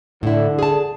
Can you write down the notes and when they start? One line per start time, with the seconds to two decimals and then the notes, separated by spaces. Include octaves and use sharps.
0.23 A2 D3 E4
0.59 G#4 A5